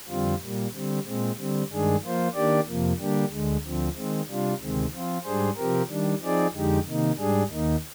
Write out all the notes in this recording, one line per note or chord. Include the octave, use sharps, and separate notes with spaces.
F2 D3 G3 C4 F4
A#2 G3 A#3
D3 G3 C4
A#2 G#3 C4
D3 G3 C4
G2 D#3 G#3 D4 G#4
F3 A#3 F4 C5
D#3 A#3 D4 G4 D5
F2 C3 F3 A#3
D3 G3 A#3 D4 G4
D2 D3 G#3
D2 D3 F3 C4
D#3 G#3 C4
C3 G3 D4 F4
D2 C3 D#3 G#3 C4
F3 C4 F4
G#2 G3 D4 G#4 C5
C3 F3 C4 G4 A#4
D#3 G3 D4
F3 C4 D#4 G#4 D5
F2 D3 G#3 D#4 G4
C3 D#3 A#3 D#4
G#2 G3 D4 G#4
D#2 D#3 A#3 D#4